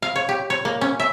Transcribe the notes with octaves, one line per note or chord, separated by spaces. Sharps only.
F5
C#5
G4
C#5
A#3
C#4
E5